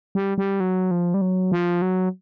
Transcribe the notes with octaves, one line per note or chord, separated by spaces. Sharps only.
G3
G3
F#3
F3
G3
F#3
F3
F#3